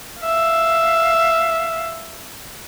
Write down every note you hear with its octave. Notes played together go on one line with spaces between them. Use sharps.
E5 F5